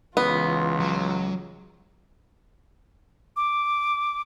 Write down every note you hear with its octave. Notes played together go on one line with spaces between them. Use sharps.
C#2 E3 B3 F4
F#3
D6